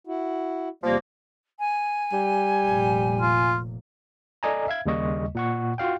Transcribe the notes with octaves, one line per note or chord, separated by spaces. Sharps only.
E4 F#4
E2 C3 F3 G3 A#3
G#5
G3
F1 A#2
F4
A4 D5 D#5 G#5 A#5
E5 F5 G#6
D#2 C#3 G3 A#3 D#5 C#6
A#2 F#5 C#6
F4 F#4 F5 G5